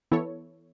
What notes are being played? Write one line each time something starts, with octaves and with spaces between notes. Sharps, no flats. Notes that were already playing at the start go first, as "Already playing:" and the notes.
E3 B3 E4 A4 C#5